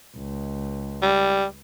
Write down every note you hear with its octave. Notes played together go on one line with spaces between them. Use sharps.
C#2
G3